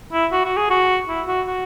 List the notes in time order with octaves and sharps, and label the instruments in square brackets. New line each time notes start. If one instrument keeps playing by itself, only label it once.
[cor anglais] E4
F#4
F#4
G#4
F#4
E4
F#4
F#4